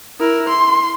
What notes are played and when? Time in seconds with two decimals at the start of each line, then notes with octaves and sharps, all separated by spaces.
0.20 E4 A#4
0.49 C6